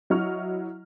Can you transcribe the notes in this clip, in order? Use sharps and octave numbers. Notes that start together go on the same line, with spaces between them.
F#3 E4 D#5 C#6 F6